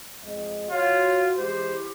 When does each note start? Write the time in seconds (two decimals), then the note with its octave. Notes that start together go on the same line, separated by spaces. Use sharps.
0.24 F2 G#3 D#5
0.70 F4 F#4 C#5
1.37 E3 G#3 E4 G4 C5